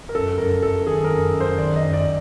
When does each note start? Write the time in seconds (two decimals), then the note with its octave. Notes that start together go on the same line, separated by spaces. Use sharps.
0.09 A#4
0.15 F#2 A4
0.38 F#2 A#4
0.62 F#2 A4
0.87 D#3 G#4
1.04 A#4
1.11 F#2
1.34 F#2
1.40 C5
1.58 D#3 D5
1.76 D#5
1.83 F#2
1.93 D5